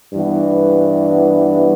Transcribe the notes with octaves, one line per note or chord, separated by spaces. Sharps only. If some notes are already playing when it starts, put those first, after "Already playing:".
G2 E3 B3